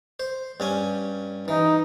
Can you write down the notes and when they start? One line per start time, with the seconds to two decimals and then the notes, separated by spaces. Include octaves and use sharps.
0.20 C5
0.60 G2 C#4 G#5
1.48 E3 D#4